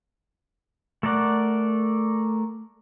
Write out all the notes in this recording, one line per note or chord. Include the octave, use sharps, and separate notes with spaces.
A3 A4 A#4 D5 F#5